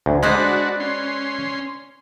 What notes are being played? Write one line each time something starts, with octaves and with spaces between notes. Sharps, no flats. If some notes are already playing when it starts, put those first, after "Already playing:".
D2
G#3 B4 C5 D5 D#5 F#5 A#5
D4 F#4
C#4 C6